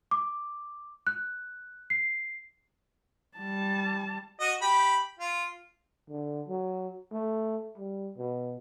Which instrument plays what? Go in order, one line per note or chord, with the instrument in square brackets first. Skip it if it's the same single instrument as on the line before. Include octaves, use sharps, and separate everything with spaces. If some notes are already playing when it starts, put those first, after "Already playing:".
[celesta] D6
F#6
C7
[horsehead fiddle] G3 A5
[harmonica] F#4 D#5
G4 B5
F4
[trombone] D3
F#3
A3
G3
B2